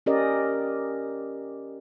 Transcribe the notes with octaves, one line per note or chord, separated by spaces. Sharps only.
C#4 G4 A#4 D5 D#5